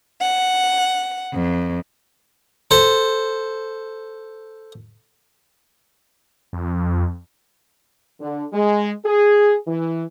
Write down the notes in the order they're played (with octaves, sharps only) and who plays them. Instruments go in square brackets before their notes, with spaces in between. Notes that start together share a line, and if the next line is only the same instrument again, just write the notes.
[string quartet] F#5
F2
[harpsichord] A4 C5
[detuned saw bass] F2
[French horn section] D3
G#3
G#4
E3